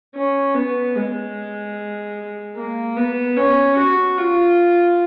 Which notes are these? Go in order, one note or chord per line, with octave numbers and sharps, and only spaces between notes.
C#4
B3
G#3
A#3
B3
C#4
F#4
F4